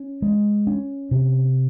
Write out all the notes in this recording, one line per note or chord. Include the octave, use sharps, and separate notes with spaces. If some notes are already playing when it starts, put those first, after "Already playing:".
Already playing: C#4
G#3
C#4
C3